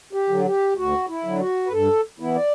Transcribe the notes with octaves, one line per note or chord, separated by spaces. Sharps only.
G4
D3 F#3
G4
D2 F#4
E4
D3 F#3
F#4
B4
G2 A4
E3 B3 E4
D5